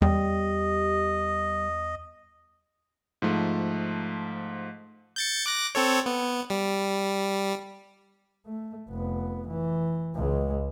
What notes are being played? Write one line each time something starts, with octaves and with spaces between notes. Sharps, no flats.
E2 G3 D#5
G#2 F3 A3
G6 A6 C#7
D6 F#6 A#6
C4 A4 C#5
B3
G3
A3
F1 B3
E3
C#2 G#3